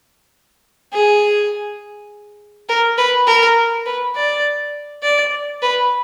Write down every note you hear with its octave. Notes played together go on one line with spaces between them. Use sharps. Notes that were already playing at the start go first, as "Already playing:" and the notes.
G#4
A#4
B4
A#4
B4
D5
D5
B4